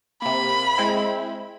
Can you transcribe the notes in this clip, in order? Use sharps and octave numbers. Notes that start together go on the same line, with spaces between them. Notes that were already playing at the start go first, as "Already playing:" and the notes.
C3 A#3 B5
G#3 C4 E4